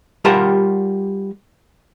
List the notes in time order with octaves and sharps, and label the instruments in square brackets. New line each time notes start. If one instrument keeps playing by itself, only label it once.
[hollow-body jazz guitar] G3 F4 G4 A#4 F#5 A5